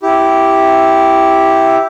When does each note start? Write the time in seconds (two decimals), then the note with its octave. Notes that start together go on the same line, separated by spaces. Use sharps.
0.02 E4 G4